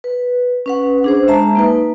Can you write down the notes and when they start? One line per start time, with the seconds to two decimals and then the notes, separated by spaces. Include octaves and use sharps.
0.04 B4
0.66 C#4 B4 F#5
1.04 D4 G#4 C5
1.28 G#3 E5 A5 A#5
1.55 A#3 D#4 B4